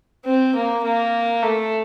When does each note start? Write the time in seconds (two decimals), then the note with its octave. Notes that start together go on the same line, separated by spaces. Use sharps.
0.25 C4
0.55 A#3
0.83 A#3
1.42 A3